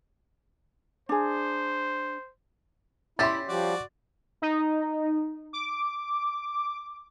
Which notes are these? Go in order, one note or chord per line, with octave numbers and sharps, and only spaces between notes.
D4 G#4 C5
C#4 E4 G4 E5 C6 A6
F3 G3 F#4 D5
D#4
D6